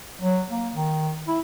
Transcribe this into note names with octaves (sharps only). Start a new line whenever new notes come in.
F#3
A#3
D#3
E4